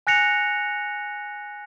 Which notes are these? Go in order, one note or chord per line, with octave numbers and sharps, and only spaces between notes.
G#5 F#6 A#6 C#7 F7